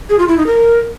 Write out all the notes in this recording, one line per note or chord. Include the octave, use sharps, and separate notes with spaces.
G#4
F4
E4
D#4
A#4